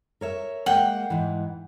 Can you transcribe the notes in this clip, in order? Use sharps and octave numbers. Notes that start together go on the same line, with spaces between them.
A#4 C#5 E5
G#3 A#3 F#5 G5
G#2 E3